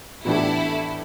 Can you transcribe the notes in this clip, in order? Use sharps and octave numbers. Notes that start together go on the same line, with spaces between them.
A2 E3 B3 D4 E4 G4 A4